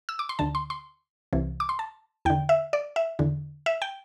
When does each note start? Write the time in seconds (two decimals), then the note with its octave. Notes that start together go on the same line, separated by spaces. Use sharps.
0.09 E6
0.19 D6
0.29 C6
0.39 D2 D3 A5
0.55 C6
0.70 C6
1.33 C2 C3 E3
1.60 D6
1.69 C6
1.79 A5
2.25 E2 D3 G5
2.49 E5
2.73 D5
2.96 E5
3.19 E2 D3
3.66 E5
3.82 G5